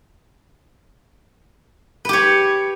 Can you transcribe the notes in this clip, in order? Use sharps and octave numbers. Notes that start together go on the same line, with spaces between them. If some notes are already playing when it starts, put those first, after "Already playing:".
G4 B4 C#5